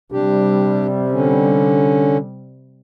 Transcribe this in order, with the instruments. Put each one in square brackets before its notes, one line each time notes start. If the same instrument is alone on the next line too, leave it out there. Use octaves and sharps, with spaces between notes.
[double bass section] C3 G3 [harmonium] D4 G4
[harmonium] D3 C#4